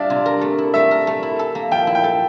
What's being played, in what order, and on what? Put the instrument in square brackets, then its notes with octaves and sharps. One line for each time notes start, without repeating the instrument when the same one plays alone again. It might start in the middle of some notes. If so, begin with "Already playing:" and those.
Already playing: [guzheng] G3 D4 [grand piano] D5 E5 F5
[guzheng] C3
A#4
A3
E4
[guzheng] A3 [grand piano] E5
[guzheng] A#4
A3
E4
A4
A#3
[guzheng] F3 [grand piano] G5
[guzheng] E4
[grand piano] G5
[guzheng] A4